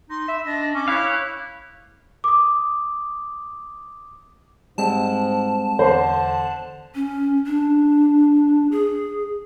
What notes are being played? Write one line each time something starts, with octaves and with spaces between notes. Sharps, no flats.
D#4 C6
E5 B5
D4 D#5 A#6
C#4 C#6 D6
E4 C#5 F5 F#6
D6 D#6
G#2 G3 G#3 C4 A5
E2 D3 C5 C6
C#4
D4
G#4